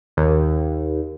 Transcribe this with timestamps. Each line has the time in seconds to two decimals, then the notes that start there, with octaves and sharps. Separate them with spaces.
0.17 D#2